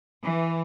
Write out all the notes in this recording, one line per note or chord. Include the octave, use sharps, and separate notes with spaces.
E3